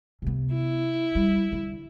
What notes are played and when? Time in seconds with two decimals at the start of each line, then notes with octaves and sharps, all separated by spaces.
0.22 C3 B3
0.54 E4
1.15 G3
1.52 D3